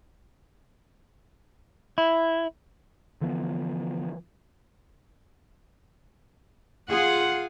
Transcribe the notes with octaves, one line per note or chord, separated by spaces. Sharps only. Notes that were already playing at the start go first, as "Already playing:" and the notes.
E4
D3 E3 F3 B3
F4 G#4 F#5